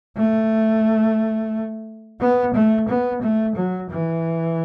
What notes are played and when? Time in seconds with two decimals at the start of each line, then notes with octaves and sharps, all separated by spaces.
0.17 A3
2.20 B3
2.54 A3
2.88 B3
3.22 A3
3.56 F#3
3.90 E3